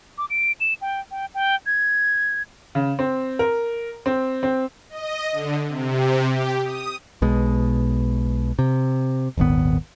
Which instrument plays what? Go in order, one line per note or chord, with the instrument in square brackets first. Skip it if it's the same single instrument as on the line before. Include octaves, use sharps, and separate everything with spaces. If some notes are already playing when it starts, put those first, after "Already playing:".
[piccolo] D6
D7
E7
G5
G5
G5
G#6
[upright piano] C#3
C4
A#4
C4
C4
[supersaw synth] D#5
D3
C3
G4
D#6
[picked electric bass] B1 B2 G#3
C3
D#1 G#1 D#3 B3